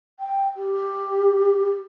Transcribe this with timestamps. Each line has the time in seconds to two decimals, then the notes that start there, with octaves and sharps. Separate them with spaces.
0.20 G5
0.57 G4